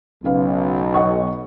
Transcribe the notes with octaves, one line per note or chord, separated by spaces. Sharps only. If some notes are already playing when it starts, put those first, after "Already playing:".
B1 C#3 B4 F5
D#5 F#5 C#6